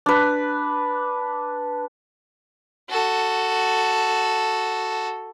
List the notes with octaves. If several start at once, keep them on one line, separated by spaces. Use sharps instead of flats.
D4 B4
F#4 A4